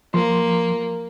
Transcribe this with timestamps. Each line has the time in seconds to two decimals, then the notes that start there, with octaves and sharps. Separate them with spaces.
0.14 F3 A#3 C6